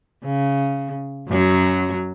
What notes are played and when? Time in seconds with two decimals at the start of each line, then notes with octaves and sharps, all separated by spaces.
0.24 C#3
1.28 F#2 F#3